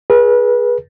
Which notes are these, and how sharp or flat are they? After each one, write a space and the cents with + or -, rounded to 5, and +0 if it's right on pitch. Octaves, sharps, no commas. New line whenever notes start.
G#4 +0 B4 -30